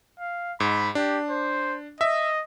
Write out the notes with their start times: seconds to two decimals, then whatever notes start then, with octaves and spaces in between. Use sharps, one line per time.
0.20 F5
0.60 G#2 B5
0.95 D4 G4
1.30 C5
2.01 D#5 E5